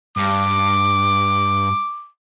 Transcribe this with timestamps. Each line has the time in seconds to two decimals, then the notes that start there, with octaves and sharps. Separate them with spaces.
0.17 G2 D6